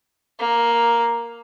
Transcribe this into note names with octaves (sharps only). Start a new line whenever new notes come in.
A#3